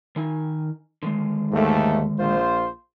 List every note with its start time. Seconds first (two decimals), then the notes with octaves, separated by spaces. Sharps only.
0.16 D#3 D#4 G#5
1.03 D3 D#3 G#3
1.51 D#2 G#2 A3
2.19 A#1 F4 C5